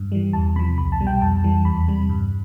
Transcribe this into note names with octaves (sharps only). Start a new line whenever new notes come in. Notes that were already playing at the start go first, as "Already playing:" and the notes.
Already playing: G2
E3 G3
E2 A5
C3 F3 B5
C2 B5
A5
B2 G3
G5
F2 A5
E3 G3
E2 B5
C3 G3
G2